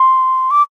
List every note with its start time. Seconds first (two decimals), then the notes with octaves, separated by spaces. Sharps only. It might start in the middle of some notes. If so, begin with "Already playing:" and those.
Already playing: C6
0.51 D6